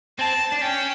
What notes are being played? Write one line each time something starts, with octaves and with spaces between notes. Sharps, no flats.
C4 A5
D4
C#4 G5